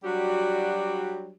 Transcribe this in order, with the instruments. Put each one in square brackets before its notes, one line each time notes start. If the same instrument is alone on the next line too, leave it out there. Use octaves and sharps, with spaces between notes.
[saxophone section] F#3 G3 D4 F#4 G4